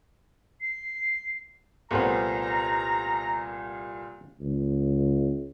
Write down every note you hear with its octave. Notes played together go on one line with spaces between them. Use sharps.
C7
C2 A#2 A3 B3 C4 A#5
C#2